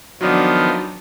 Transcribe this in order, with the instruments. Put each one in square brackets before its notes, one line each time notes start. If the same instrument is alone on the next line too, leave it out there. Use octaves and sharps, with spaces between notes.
[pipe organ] D#3 F3 B3 [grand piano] F#3 D4